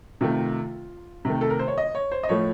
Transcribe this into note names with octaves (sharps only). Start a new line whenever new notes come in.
C3 D#3 A3 F4
C3 D#3 A3
A4
A#4
C5
C#5
D#5
C#5
C5
D#5
A2 F3 A3 C#5